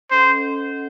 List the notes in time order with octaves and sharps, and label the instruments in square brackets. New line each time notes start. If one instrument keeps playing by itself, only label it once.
[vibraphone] C#4 A4 D#5 F#5 [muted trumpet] C5